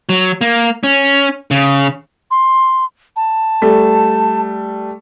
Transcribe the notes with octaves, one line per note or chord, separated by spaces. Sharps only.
F#3
A#3
C#4
C#3
C6
A5
G3 A3